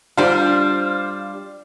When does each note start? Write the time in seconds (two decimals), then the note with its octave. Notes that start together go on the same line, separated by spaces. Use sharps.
0.17 G3 D4 F4 C5